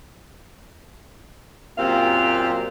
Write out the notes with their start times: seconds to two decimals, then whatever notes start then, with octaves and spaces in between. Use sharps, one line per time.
1.78 F#2 A#2 C4 G4 F5